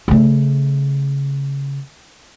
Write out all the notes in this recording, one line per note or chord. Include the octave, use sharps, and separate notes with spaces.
C#3 A3